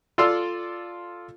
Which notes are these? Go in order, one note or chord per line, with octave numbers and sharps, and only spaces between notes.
F4 A4 D5 F5 C6 E6